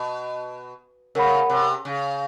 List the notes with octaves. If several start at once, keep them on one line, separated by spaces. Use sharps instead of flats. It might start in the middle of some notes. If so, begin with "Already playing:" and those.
Already playing: B2
C#3 A#4 C#5 F#5 B5
C3
C#3